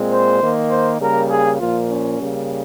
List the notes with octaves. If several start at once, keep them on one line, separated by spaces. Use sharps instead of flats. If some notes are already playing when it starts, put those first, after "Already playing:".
Already playing: A#2 G#3 C4
C5
D#3 A#3
C5
C#3 G3 A#3 A#4
G#4
A#2 F3 A#3 F4
C#4
C#3 G3 A#3